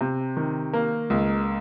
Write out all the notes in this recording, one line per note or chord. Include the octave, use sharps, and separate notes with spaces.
C3
D#3
A#3
C#2